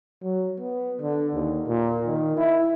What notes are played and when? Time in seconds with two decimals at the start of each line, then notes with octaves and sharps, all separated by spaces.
0.22 F#3
0.60 B3
1.01 D3
1.34 D#2
1.67 A#2
2.06 D#3
2.37 E4